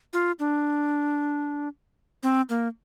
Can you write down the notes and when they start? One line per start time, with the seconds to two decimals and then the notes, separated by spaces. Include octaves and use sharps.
0.13 F4
0.39 D4
2.23 C4
2.49 A#3